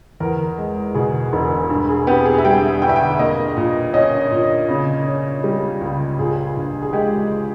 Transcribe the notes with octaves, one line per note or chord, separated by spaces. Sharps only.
E2 A#4
G#3
B2 G#4
E1
G2
G#4
B3 G4
G#4
E5
G3 G5
G1 G5
E5
G5
A#3 D#5
A#2
C#4 D#5
A#2
C#3
C#4
G3
C#2
A#2 G#4
A#1
G#4
G#3 G4